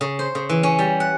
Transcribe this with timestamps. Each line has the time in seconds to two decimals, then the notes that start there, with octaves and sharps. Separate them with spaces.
0.01 C#3
0.19 C5
0.35 C#3
0.49 E3
0.63 C#4
0.79 G3
1.00 F#5